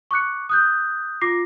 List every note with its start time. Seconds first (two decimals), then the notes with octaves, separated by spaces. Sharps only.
0.11 C#6 D6 F#6 C#7
0.49 D#6 F#6 G6
1.21 F4 D6 A#6 C7